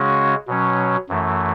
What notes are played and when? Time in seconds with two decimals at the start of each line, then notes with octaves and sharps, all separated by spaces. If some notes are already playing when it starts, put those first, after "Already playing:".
Already playing: C#3 G#3 C#4 F#4
0.47 B2 F#3 C#4
1.09 F#2 E3 A3